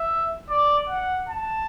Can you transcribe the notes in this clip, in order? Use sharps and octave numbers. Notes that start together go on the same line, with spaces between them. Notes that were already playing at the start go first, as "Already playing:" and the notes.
Already playing: E5
D5
F#5
A5